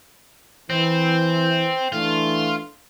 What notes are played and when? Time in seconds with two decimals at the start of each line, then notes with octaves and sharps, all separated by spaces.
0.70 E3 C4
1.92 E3 A3 D4 F4